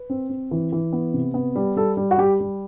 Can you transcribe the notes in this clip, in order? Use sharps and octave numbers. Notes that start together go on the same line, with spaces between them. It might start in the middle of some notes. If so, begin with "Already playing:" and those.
Already playing: B4
C4
C4
E3
E3
B3
C3
B3
G3
G3 A4
G3
F#4
G3 G4
G3